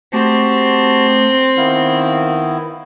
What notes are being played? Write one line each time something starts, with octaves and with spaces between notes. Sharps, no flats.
A3 C4 F#4 G4 A5
D#3 B3 E4 F5